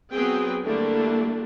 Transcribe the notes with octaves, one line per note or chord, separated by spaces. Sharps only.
F#3 B3 C4 G#4 G5
D3 G3 A3 A#3 D4 E4